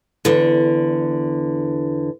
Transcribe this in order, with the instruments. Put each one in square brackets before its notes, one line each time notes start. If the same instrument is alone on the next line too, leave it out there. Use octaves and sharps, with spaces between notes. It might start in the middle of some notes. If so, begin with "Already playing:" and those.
[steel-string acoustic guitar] E2 D3